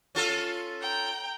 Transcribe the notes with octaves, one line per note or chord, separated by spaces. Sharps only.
C#4 F4 A4
G5 A#5